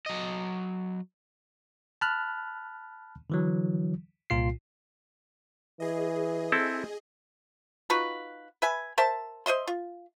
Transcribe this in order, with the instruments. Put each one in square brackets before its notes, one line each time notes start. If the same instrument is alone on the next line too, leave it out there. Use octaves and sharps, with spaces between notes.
[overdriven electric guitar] F#3 D#5
[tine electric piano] A5 B5 F6 F#6
D3 E3 F#3
C2 A#2 F4 C7
[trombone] E3 [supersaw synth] G#4 D#5
[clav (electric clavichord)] C4 E4 A4
[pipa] D#4 F4 F#4 B4
B4 E5 G#5
A#4 C5 E5 A5
C5 D#5 E5 C6
F4